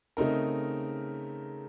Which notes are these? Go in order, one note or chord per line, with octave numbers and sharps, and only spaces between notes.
C#3 A3 C4 D#4 A#4